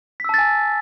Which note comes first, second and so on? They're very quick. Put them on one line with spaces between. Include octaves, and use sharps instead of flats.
B6 E6 A5 A6 G#5